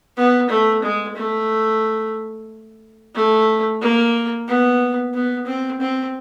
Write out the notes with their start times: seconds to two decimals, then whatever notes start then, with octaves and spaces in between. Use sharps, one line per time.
0.17 B3
0.50 A3
0.83 G#3
1.16 A3
3.15 A3
3.82 A#3
4.48 B3
5.14 B3
5.47 C4
5.81 C4